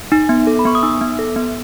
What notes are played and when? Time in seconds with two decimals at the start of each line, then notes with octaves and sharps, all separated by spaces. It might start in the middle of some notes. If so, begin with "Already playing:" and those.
0.12 D#4
0.29 B3
0.47 A4
0.59 B5
0.65 B3 C#6
0.75 D#6
0.83 D#4 E6
1.01 B3
1.19 A4
1.36 B3